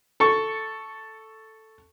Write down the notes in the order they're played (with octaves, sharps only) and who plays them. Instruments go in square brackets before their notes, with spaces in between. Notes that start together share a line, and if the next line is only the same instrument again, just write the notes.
[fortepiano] A4 C#6